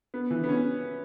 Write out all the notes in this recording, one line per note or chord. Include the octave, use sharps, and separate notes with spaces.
B3
E3
B3
C#4